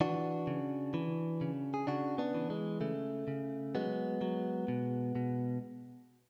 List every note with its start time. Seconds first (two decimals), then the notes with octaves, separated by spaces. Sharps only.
0.01 E3 D4 F#4
0.47 C#3
0.94 E3
1.41 C#3
1.74 G#4
1.87 C#3 D4 F#4
2.18 B3 D4
2.34 E3
2.50 G#3
2.81 C#3 A3
3.28 C#3
3.75 F#3 G#3 B3
4.21 F#3
4.68 B2
5.15 B2